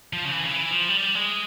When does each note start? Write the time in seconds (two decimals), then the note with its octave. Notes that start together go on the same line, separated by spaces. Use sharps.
0.13 F3
0.25 C#3
0.31 E3
0.44 C#3
0.51 E3
0.70 F3
0.89 G3
1.15 G#3